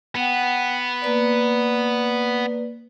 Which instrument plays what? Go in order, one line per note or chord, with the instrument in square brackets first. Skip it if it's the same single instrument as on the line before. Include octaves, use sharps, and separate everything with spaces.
[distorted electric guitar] B3 [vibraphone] F#5 G5
[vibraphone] A#3 B4 D5